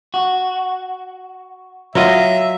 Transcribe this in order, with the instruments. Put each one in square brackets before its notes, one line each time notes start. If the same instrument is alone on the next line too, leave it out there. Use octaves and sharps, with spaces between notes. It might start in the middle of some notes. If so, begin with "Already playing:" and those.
[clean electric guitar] F#4
[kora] F#3 F4 D#5 [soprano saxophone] E5